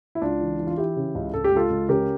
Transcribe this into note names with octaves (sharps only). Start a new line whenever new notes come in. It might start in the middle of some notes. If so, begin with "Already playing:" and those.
E4
C#2 D4 F4
E3
E3
F4
E3 E4 G4
C#3
C#2
C#2 A4
G4
C#2 F4 A4
C#2
C#3 G4 A#4